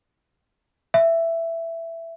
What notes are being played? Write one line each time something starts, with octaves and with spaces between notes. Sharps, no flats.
E5